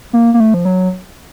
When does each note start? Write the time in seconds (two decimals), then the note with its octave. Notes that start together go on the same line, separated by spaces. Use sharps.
0.13 A#3
0.34 A#3
0.40 A3
0.54 F3
0.65 F#3